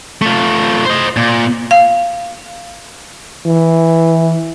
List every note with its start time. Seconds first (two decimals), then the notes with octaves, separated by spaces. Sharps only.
0.22 A3 F4
0.85 C5 D#5
1.17 A#2
1.71 F5
3.46 E3